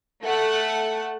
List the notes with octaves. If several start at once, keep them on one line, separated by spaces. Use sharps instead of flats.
A3 F#5